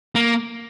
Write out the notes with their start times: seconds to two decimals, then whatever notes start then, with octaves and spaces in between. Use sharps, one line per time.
0.15 A#3